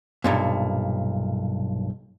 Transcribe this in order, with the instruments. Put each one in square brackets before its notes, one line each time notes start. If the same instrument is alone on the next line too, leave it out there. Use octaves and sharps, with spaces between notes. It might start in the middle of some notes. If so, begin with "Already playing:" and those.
[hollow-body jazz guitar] B1 G2 A#2